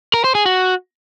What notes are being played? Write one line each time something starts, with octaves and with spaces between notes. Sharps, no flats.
A#4
C5
G#4
F#4